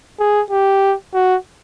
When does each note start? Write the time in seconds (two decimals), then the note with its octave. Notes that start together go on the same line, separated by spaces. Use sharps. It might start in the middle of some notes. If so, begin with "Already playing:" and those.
0.20 G#4
0.50 G4
1.14 F#4